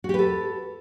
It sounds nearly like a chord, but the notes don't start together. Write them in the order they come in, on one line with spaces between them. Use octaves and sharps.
F#4 G4 B4 A4